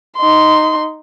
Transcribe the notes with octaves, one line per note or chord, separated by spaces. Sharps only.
D#4 C6